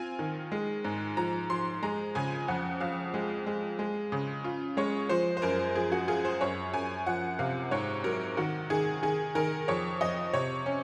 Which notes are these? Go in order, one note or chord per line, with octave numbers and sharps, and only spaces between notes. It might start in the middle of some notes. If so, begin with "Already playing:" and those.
Already playing: C4 F4 G#5
D#3
G#3
G#2
F3 A#5
F3 C6
G#3 A#5
C#3 G#5
F2 F#5
F2 F5
G#3
G#3
G#3
C#3
F4
G#3 C#5
F3 C5
C5
F#2 A#4
F3 G#4
F#4
F4 G#4
C5
F#2 C#5
F#2 G#5
F3 F#5
C3 F5
G#2 C#5
F#3 A#4
D#3 F#4
D#3 G#4
D#3 G#4
D#3 A#4
F2 C#5
F2 D#5
C3 C#5
C#4